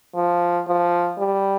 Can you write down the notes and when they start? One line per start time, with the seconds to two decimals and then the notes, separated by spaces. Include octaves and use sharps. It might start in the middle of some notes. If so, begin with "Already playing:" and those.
0.16 F3
0.67 F3
1.18 G3